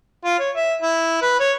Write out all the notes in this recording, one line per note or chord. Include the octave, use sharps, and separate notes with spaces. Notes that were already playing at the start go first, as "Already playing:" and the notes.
F4
C#5
E5
E4
B4
C#5